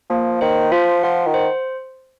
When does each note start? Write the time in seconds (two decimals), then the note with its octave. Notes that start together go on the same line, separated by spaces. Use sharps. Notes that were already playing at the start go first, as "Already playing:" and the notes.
0.10 F3 A#3
0.41 D#3 C5
0.72 F3 F4
1.03 F3 F#5
1.27 D#3
1.34 C5